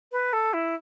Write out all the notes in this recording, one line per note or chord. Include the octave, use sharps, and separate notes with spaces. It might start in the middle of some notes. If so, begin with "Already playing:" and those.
B4
A4
E4